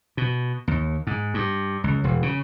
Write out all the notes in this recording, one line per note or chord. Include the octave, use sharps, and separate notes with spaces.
B2
D#2
G#2
G2
C#2
E1
C#3